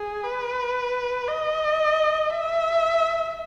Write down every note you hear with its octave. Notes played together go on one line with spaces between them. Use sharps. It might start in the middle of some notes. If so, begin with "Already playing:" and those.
Already playing: G#4
B4
D#5
E5